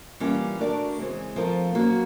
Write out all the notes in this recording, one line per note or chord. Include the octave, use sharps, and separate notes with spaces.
E3 G3 A#3 C#4 F4
A3 D4 F#4 A#4 D5
C#3 E3 G#3 C4
F3 A3 C4 F4 A#4
F#3 A#3 C#4 F#4